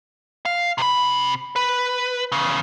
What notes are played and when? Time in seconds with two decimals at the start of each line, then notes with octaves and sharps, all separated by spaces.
0.45 F5
0.78 C3 B5
1.56 B4
2.32 E2 C#3